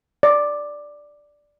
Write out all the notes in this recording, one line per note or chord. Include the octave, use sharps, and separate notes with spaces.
D5